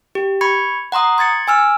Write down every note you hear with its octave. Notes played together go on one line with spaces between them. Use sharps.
G4
B5 C#6 G#6 C#7
F#5 A#5 C6 D#6
C6 G#6 A6 C#7
G#5 E6 F6